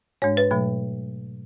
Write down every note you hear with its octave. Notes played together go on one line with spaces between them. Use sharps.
G#2 G#3 D4 C#5
B4
B2 F#3 A3